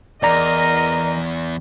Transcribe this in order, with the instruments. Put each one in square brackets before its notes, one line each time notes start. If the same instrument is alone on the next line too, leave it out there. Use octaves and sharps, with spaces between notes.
[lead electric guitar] E2 [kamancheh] A#4 D#5 [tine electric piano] D5 A#5